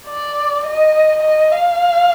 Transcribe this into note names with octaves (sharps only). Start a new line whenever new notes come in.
D5
D#5
D#5
F5